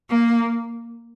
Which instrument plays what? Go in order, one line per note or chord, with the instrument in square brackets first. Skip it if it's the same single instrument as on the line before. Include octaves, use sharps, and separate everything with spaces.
[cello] A#3